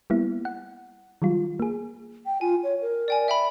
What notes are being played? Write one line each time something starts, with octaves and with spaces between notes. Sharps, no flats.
G3 A#3 B3 E4
F#5
D#3 F#3 G3 F4
A#3 G#4
G5
F4 G#5
C#5
A#4
D5 G5 G#5
E5 G5 B5